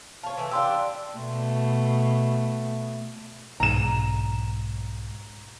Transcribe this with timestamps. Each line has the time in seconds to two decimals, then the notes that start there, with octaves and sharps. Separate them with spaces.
0.24 F4 C#5 A5
0.37 E3 A3
0.51 D4 G4 F5 C6 E6
1.16 B2 A3
3.60 B1 G#2 A#5 E7